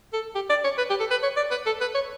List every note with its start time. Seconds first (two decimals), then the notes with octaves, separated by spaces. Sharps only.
0.13 A4
0.35 G4
0.50 D5
0.64 C#5
0.78 B4
0.90 G4
1.00 A4
1.11 B4
1.23 C#5
1.36 D5
1.51 B4
1.66 A4
1.81 B4
1.95 C#5